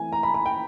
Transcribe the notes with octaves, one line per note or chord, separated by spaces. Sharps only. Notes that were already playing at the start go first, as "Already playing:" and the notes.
Already playing: E3 A3 C4 G#5
A#5
B5
B5
G5